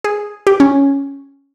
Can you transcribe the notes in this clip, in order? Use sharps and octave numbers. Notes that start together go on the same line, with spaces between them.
G#4
G4
C#4